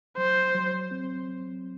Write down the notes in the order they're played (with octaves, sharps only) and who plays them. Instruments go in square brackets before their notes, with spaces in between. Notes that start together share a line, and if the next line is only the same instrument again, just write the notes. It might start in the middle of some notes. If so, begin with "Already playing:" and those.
[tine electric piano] F#3 [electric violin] C5
[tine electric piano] F#3
C4